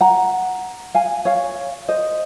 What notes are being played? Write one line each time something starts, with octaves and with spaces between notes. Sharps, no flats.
F#5 A#5
F5 G#5
C#5 F5
C5 D#5